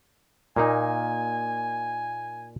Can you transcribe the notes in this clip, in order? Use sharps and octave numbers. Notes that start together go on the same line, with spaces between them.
A#2 A#3 D#4 G#5